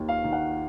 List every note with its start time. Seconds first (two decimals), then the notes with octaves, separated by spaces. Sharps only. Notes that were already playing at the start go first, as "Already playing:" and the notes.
Already playing: D#2 D#3
0.09 F5
0.24 D#3
0.33 F#5